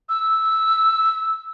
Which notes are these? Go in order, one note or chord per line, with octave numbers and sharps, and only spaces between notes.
E6